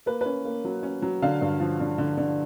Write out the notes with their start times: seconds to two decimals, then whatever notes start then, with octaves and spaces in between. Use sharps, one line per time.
0.06 A#3 B4
0.21 C#4 B4
0.45 A#3
0.65 F#3
0.83 C#4
1.02 F#3
1.22 D3 F5
1.41 G2
1.60 F3
1.80 D3
1.98 D3
2.18 D3